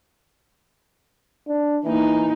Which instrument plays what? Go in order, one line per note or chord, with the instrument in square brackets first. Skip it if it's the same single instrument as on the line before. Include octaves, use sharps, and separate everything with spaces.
[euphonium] D4
[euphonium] E3 [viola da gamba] A#3 D#4